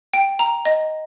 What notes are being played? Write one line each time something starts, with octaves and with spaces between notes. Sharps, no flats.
G5
A#5
D#5